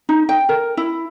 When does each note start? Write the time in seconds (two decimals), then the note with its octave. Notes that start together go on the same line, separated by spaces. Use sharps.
0.09 D#4
0.29 G5
0.49 A#4
0.77 E4